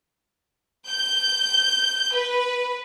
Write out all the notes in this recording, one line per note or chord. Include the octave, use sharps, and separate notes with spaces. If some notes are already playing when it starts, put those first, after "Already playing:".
G6
B4